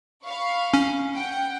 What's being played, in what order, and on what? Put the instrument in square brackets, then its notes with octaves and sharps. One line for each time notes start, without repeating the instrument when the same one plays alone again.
[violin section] F5 B5 C#6
[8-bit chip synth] C#4
[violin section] F#5 G5